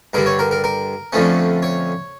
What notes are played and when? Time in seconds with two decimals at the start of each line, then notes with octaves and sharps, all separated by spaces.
0.13 G2 D3 G3 A#4
0.26 C#5
0.39 A#4
0.51 A#4
0.64 A#4
1.13 F2 D3 F3 A3 C#4
1.63 C#5